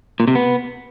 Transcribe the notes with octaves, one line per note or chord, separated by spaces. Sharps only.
A#2
C3
B3